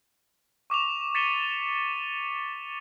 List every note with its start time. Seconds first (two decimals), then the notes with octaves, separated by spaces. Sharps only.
0.70 C#6 D6 E7 F7
1.15 A6 B6 C#7 D#7 E7 G7